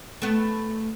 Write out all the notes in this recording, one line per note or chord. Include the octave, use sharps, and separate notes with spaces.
A3 B3